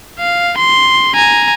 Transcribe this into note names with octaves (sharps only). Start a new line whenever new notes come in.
F5
C6
G#5 A#5